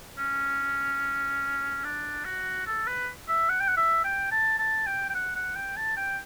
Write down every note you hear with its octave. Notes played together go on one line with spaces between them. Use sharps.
C#4
D4
F#4
A4
B4
E5
F#5
G5
F#5
E5
G5
A5
A5
G5
G5
F#5
F#5
G5
A5
G5